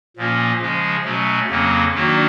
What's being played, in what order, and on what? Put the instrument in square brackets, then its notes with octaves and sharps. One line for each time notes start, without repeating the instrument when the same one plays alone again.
[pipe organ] A#2 F3 A#3 C#4
C#3 F3 G#3 C#4
B2 F#3 A3 C#4
F2 C#3 F#3 A#3 C#4
[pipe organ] D#3 F#3 A#3 D#4 F#4 [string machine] D4